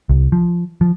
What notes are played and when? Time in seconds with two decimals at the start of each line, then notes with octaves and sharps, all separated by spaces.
0.09 C2
0.32 F3
0.81 F3